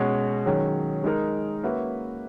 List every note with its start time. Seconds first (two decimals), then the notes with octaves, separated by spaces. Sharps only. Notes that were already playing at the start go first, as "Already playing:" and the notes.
Already playing: B2 G#3 C#4 F#4
0.45 D#3 F#3 C#4 G#4
1.04 G#3 D#4 A#4
1.63 A#3 C#4 F#4 B4 E5